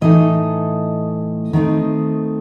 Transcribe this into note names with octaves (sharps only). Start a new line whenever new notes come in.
A2 E3 A3 D#4 D#5
D#3 A3 C4 D#4